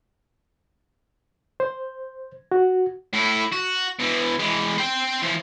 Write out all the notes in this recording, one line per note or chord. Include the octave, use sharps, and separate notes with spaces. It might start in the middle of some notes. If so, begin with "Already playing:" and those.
C5
F#4
A2 E4
F#4
B2 E3
E3 G#3
C5 G5
E3 F3